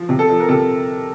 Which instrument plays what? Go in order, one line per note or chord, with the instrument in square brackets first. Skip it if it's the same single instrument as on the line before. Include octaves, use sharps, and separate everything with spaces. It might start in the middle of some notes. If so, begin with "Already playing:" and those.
Already playing: [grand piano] F3
C3
A4
F3
A#4
C3 A4